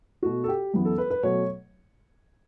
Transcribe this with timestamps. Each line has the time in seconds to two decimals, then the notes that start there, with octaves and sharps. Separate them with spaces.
0.22 B2 A3 F#4
0.44 A4
0.48 G4
0.74 F#2 E3 B3
0.85 A4
0.98 B4
1.10 B4
1.23 B2 F#3 A3 C#5